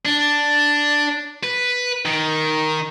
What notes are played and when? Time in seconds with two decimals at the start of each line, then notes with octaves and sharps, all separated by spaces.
0.06 D4
1.43 B4
2.05 D#3